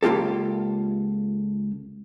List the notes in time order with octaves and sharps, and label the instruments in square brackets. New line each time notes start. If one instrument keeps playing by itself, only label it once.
[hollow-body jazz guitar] C#2 A#3 F4 G4 A4